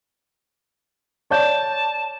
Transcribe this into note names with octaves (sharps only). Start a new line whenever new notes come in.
C#5 D5 A5 G6